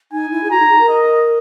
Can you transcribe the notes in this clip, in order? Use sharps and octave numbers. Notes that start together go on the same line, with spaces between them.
D#4 G#5
E4
G#4
F#4 A#5
D#4
G#4
A#4
D#5